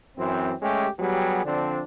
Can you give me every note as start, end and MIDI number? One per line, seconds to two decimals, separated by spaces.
0.17 0.52 42
0.17 0.52 52
0.17 0.52 60
0.62 0.86 56
0.62 0.86 57
0.62 0.86 61
0.62 0.86 67
0.99 1.41 54
0.99 1.41 55
0.99 1.41 59
0.99 1.41 67
0.99 1.41 68
1.45 1.81 50
1.45 1.81 53
1.45 1.81 60
1.45 1.81 62